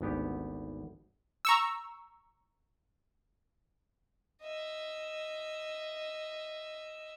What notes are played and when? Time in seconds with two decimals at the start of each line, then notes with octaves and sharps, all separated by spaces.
0.01 G#1 D2 B3 G4
1.45 A#5 C#6 E6
4.41 D#5 E5